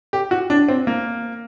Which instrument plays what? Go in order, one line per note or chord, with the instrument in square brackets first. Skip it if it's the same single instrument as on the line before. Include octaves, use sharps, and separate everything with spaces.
[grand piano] G4
F#4
D4
C4
A#3